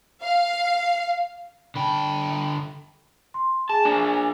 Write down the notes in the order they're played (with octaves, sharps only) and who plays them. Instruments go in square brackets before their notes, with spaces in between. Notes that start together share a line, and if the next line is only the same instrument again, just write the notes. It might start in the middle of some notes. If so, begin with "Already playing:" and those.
[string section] F5
[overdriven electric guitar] D3 G5 [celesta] A5 B5
[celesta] C6
[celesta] G#4 G#5 [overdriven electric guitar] A5
[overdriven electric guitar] A#3 D4